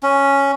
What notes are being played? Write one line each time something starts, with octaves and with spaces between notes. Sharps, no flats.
C#4